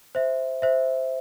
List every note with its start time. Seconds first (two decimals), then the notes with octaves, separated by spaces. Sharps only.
0.15 C5 E5
0.62 C5 E5